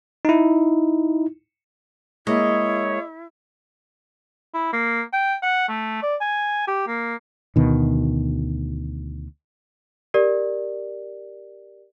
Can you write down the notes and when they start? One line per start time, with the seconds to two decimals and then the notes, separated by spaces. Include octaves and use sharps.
0.25 D#4 E4
2.27 G#3 A#3 E4 C#5 D#5
4.54 E4
4.73 A#3
5.13 G5
5.42 F#5
5.69 A3
6.03 D5
6.21 G#5
6.68 G4
6.88 A#3
7.56 D2 B2 D#3
10.14 G4 A#4 D5